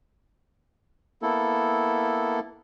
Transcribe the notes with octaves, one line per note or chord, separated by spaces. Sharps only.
A#3 B3 E4 A4